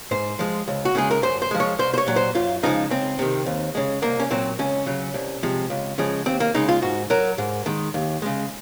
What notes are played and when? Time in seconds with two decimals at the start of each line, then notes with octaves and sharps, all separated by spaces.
0.11 G#2 C5
0.39 F3 G#3
0.68 C#2
0.85 F#4
0.95 C#3 G#3 G#4
1.11 A#4
1.23 F#2 C5
1.42 C5
1.51 F3 G#3
1.60 C#5
1.79 C2 C5
1.94 C5
1.98 C#5
2.07 A#2 F#3
2.16 C5
2.35 F#2 F4
2.63 C#3 F3 G#3 D#4
2.90 C#2 C4
3.19 C3 D#3
3.46 D#2
3.75 C#3 G#3
4.02 C2 A#3
4.20 C#4
4.31 A#2 F#3 C4
4.59 C#2 C#4
4.86 C#3 F#3
5.14 C2
5.43 C3 F3 G#3
5.70 C#2
5.98 C#3 F3 G#3
6.26 D#2 C4
6.40 A#3
6.54 C#3 G#3 D#4
6.69 F4
6.82 G#2 F#4
7.10 F#3 A#4
7.38 G#2
7.66 D#3 G#3
7.94 D#2
8.22 C#3 G#3